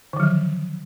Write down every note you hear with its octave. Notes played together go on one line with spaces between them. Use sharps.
D3 D#3 F3 F#3